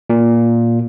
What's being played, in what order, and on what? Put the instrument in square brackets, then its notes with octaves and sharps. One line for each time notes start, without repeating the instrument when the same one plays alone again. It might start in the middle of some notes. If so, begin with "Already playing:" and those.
[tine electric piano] A#2